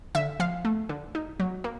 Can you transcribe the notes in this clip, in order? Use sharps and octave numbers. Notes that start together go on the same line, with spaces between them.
D3 E5
F3 F5
A3
D3
D#4
F#3
A#3